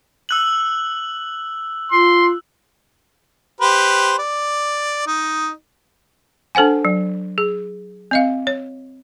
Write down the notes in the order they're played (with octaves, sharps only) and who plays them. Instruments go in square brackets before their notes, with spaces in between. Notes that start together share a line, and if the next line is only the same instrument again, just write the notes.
[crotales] E6 F#6 F#7
[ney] F4 [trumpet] C6
[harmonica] G4 B4 C5
D5
D#4
[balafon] D4 A4 C5 F#5 G#5
F#3
G#4
C4 D#5 F5
C#5